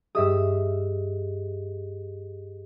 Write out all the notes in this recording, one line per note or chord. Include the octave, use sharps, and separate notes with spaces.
G2 G4 G#4 D#5 E5 D#6